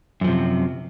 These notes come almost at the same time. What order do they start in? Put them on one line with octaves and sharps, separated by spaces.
F#2 F3 C3